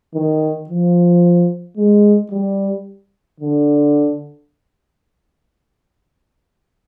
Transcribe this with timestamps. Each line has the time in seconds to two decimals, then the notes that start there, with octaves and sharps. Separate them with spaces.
0.14 D#3
0.69 F3
1.77 G#3
2.31 G3
3.40 D3